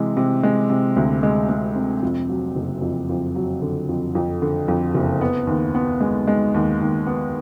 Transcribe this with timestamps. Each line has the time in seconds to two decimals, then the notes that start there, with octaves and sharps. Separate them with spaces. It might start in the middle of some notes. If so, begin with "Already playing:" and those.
Already playing: C3 E3 G#3
0.17 C3
0.43 G#3
0.70 C3
0.97 D2
1.23 G#3
1.49 G#3
1.76 C3
2.02 F2
2.29 F#3
2.56 F#1
2.82 F2
3.09 F2
3.35 F#3
3.61 D3
3.89 F2
4.15 F2
4.42 D3
4.68 F2
4.94 F#1
5.21 B3
5.47 D#2
5.75 B3
6.00 G#3
6.27 G#3
6.54 D#2
6.81 D#2
7.07 B3